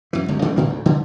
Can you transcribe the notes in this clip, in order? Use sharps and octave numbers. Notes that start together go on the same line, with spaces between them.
F#2 E3
G1 C#2 F#2
C#3 E3 A3
A2 D3 A#3
D2
D3 F3